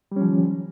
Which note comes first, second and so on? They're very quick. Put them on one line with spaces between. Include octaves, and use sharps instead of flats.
G3 C#4 F3 D#3